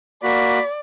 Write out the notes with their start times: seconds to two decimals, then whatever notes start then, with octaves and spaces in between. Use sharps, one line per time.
0.23 A#3 F#4 D5 B5